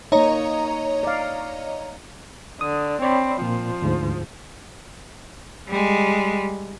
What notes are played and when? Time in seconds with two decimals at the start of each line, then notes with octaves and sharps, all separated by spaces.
0.12 A#3 D#4 C#5 D#5 A#5
1.03 D5 F5
2.61 D3 D#6
3.02 C4 C#5 D5 B5
3.42 A#2 F3
3.82 D2 G#2
5.69 G3 G#3